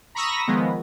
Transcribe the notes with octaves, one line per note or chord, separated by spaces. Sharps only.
A#5 B5 C#6 D#6 E6 A#6
D#3 F3 G#3 B3